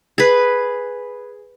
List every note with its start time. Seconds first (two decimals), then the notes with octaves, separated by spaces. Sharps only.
0.18 G#4 B4